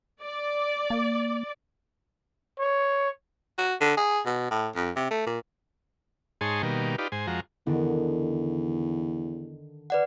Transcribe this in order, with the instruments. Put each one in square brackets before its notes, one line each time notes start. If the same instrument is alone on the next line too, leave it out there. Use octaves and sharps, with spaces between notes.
[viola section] D5
[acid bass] A#3
[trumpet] C#5
[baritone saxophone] F#4
D3
G#4
B2
A2
F2
C3
A3
A#2
[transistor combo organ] G#2 D#4 G#4 C#5 A5 C6
B2 D#3 G3 A#3
D#4 F4 G4 B4 D5
G#2 C5 G#5
F2 F3 G#3 F#4 A#5
[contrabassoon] E2 [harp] D3 D#3
[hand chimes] B4 D5 F#5